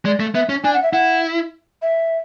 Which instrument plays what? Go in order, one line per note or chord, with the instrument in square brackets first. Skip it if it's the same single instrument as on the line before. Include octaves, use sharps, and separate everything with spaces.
[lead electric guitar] G#3 [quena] D5
[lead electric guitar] A3
[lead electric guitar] B3 [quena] E5
[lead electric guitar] C#4
[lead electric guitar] D4 [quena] G#5
[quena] F#5
E5
[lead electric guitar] E4 [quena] F#5
[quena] E5